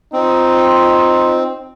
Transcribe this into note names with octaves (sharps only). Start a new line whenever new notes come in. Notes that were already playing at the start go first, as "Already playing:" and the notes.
C4 D#4 F4